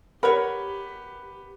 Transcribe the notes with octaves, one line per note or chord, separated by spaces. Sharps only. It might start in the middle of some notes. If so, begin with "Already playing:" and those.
G4 A#4 B4 C#5 F#5 B5